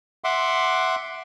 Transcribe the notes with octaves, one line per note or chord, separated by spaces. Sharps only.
E5 F#5 C6 D6